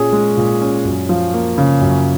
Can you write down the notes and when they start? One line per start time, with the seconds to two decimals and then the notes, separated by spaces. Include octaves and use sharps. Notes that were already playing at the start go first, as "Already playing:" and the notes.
Already playing: A#2 C#4 G#4
0.12 G#3
0.37 A#2
0.61 C#4
0.85 F#2
1.09 F3
1.34 A#3
1.58 C#3
1.81 F#2